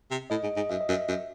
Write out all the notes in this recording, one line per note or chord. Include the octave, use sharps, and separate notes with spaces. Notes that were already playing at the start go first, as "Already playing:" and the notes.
C3
A2 D#5
G#2 D#5
G#2 D#5
F#2 E5
D#5
F#2
E5
F#2